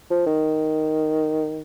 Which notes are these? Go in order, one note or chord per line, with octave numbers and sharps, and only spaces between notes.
F3
D#3